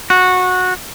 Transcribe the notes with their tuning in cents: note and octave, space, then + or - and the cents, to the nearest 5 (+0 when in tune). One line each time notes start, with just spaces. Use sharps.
F#4 -15